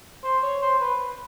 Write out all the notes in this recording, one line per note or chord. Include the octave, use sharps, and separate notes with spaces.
C5
C#5
C5
B4